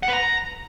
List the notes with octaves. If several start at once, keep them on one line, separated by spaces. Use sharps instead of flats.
F#5
B4
A#5